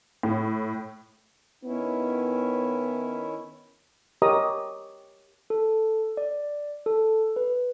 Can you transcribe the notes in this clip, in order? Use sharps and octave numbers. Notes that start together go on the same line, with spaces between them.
A2
D#3 B3 C#4 E4
G4 A#4 C#5 D#5 A#5 D#6
A4
D5
A4
B4